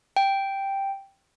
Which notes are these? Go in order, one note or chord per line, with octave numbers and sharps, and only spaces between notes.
G5